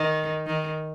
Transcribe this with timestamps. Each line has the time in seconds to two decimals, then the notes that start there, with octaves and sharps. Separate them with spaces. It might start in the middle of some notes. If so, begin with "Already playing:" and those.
Already playing: D#3
0.46 D#3